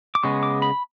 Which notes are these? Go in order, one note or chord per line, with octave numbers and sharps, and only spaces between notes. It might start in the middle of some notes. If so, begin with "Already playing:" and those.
D6
C#3 G#3 B3 C#6
D6
B5